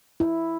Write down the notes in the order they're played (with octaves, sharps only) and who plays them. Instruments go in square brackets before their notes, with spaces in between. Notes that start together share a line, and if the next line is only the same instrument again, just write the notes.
[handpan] E4